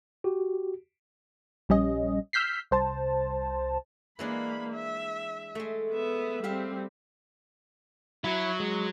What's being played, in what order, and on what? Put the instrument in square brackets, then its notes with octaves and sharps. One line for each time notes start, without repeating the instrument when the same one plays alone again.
[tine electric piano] F#4 G4
[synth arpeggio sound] A#1 G3 C#4 D#5
E6 F6 G6 B6 C7
C2 C5 A5
[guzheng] E3 G#3 D4 [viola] A#3 B5
[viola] E5
[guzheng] G#3 A3
[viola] B3 E5
[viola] G3 C4 [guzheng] G4 E5 F5
[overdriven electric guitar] F#3 [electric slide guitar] E4
[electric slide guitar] G#3